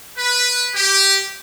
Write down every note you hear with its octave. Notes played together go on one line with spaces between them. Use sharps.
B4
G4